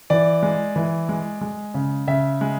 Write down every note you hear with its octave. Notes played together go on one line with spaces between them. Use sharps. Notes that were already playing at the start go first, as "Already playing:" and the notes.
E3 D5
G#3
E3
G#3
G#3
C#3
C#3 E5
G#3